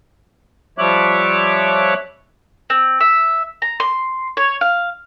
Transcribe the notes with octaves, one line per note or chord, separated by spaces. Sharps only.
F3 G3 C#5 E5 D6 F#6
C4
E5
A#5
C6
C#5
F5